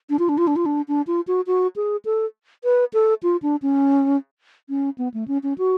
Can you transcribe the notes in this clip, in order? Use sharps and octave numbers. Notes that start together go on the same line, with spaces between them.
D4
F4
D4
F4
D4
F4
D4
D4
F4
F#4
F#4
G#4
A4
B4
A4
F4
D4
C#4
C#4
B3
A3
C#4
C#4
F#4